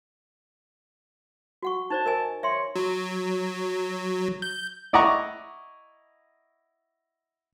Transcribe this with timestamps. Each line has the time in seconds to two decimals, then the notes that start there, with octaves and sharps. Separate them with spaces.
1.63 F#4 F#5 C#6
1.90 D#4 C5 D5 A5
2.06 A#4 D#5 G#5
2.43 C#5 E5 C6
2.76 F#3
4.42 G6
4.93 E4 D5 D#5 F#5 A#5 C#6